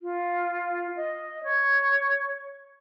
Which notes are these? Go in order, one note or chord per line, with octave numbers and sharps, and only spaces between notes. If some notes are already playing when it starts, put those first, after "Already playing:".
F4
D#5
C#5